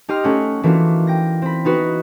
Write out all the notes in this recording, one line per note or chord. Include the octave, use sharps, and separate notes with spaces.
D#4 G4 D#5 C6 F6
A3 C#4 F#5
E3 A3 A#3 D4 F4 F#4
G5 A#6
C4 B5
B3 D#4 F#4 B4